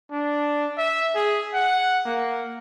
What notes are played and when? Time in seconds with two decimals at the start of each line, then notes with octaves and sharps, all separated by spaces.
0.11 D4
0.78 E5
1.15 G#4
1.54 F#5
2.06 A#3